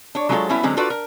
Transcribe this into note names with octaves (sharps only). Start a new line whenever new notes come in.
D4 C#5
F#3 G#3 D4 F4 A4 C#5
F#3 G3 B3 C#4 E4
D3 F#3 G#3 C4 C#4
D4 F4 F#4 A4 B4 D5
A#4